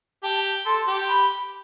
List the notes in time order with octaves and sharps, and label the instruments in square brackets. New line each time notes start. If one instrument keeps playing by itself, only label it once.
[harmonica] G4 [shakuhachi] A5
[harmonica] A4 [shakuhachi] C6
[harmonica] G4
[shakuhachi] B5